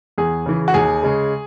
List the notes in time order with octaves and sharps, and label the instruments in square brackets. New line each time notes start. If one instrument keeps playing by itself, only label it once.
[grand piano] E2 G#4
C#3 E3
F#4
D#2 G#4
C#3 G#3